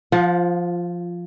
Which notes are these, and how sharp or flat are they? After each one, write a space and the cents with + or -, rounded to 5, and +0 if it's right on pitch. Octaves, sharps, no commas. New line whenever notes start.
F3 +0 F4 -15 F5 +45